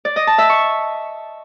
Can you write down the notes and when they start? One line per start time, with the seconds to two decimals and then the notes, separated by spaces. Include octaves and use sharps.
0.05 D5
0.16 D#5
0.27 A5
0.38 E5
0.49 C#6